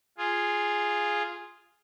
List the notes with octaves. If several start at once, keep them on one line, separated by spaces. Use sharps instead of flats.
F4 G#4